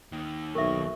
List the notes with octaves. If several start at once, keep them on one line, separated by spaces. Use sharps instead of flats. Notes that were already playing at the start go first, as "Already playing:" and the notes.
D#2 D#3
B1 A#4 E5 C#6